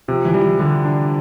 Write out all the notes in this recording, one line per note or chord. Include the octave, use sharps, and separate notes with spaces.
C3 F3
E3
G3
E3
D3 G3
D4